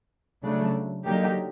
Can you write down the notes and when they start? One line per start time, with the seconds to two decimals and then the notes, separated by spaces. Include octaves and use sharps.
0.44 C#3 F#3 A3 D4
1.04 D3 F#3 A#3 D#4 G4